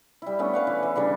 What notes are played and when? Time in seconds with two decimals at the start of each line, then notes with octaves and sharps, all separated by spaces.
0.22 G3 E4
0.39 A3 B3 C#4 D4
0.54 B4 F5 F#5
0.67 E3
0.83 E3
0.96 C#3 E3 G3 D4